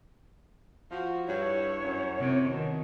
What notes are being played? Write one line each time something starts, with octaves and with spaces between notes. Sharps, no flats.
F3 F#4
G2 E4 C#5
F#2
C3
B2 D#3